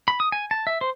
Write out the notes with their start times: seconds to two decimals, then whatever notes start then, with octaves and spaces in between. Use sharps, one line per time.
0.08 B5
0.20 D#6
0.32 G#5
0.51 A5
0.67 E5
0.81 C5